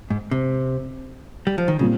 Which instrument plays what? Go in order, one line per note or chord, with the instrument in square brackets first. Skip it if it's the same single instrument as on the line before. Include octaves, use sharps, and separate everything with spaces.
[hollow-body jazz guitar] G#2
C3
G3
F3
D#3
[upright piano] A#2 G3 C4 F4 [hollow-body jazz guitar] C#3